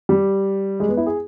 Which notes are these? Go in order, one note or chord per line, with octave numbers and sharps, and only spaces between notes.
G3
G#3
B3
E4
G#4